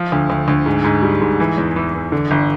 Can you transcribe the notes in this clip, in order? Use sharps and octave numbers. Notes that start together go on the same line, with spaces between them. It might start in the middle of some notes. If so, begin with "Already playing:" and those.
Already playing: F3
D2
D2
D2
G#2
G#2
G3
G#2
E3
E2
E3
E3
D3
G1